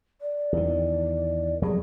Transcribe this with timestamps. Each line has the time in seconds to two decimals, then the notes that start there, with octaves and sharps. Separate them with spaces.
0.21 D5
0.52 E2 D#3
1.62 F2 F#3 G3 G#4